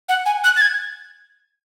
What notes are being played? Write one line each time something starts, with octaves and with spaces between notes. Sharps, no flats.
F#5
G#5
F#6
A6
G#6